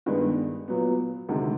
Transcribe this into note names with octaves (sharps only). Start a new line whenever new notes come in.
G2 D#3 G#3 B3
A#2 F#3 B3
D2 C3 D#3 G#3